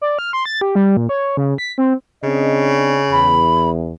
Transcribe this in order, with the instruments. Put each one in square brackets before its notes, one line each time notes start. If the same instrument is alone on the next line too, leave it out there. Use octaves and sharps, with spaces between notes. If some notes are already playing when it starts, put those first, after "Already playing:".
[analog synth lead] D5
F6
C6
A6
G4
G3
A#2
C#5
C#3
B6
C4
[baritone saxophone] C#3 [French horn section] C4 D4 D#5
[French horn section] E2 [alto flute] B5